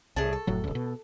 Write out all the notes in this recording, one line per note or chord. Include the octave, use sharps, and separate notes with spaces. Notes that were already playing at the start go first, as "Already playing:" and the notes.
C2 A2 G#4 A5
A4
F1 A2 F#3
D1 C#2
B2